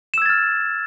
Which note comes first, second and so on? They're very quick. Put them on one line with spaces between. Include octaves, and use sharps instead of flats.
E7 E6 G#6 A6 F6